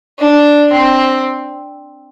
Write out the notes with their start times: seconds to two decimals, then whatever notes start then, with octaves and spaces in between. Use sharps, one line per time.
0.19 D4
0.72 C4